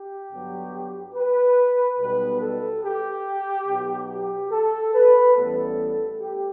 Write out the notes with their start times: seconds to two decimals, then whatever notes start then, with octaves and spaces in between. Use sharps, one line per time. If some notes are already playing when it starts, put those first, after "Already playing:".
Already playing: G4
0.31 G2 D3 F#3 B3
1.15 B4
1.99 B1 B2 G3 B3 B4
2.41 A4
2.83 G4
3.67 B1 B2 F#3 B3
4.09 G4
4.51 A4
4.94 B4
5.35 A1 A2 G3 B3 A4
6.19 G4